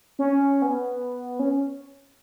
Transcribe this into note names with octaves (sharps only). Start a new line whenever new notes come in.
C#4
B3
C#4